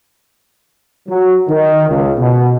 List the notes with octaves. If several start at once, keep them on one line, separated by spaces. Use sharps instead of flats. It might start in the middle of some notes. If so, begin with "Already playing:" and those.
F#3
D#3
C#2
B2